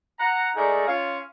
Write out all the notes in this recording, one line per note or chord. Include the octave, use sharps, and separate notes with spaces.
F#5 A#5
G#3 A3 D#4 G#4 A#4 D5
C#4 F4 F5